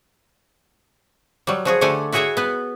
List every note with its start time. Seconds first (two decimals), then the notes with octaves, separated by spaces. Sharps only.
1.47 F#3 G3
1.65 F3 F#4 G#4
1.81 D3 A3 G4 A4 F#5 G#5
2.12 E4 F#4 G#4 C#5 E5 F#5
2.37 B3 B4